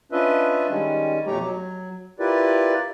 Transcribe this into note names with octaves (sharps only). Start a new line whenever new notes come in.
C#4 D4 F4 B4 D#5 E5
D#3 G3 G#3 C#4
F2 B2 A3 G4 C#5 A#5
F#3
E4 F4 G4 A#4 B4 D5